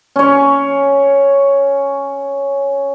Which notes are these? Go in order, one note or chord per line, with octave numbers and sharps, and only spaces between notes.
C#4 C#5